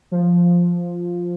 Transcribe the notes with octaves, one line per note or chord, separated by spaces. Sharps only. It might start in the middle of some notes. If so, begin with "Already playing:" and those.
F3